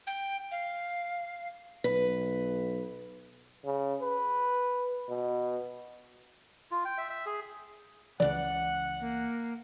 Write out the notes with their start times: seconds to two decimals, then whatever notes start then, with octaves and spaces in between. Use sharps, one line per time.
0.07 G5
0.51 F5
1.84 B1 B4
3.65 C#3
4.01 B4
5.09 B2
6.71 F4
6.85 G5
6.98 E5
7.10 E5
7.26 G#4
8.20 C#2 C#3 E3 D5 F#5
9.00 A#3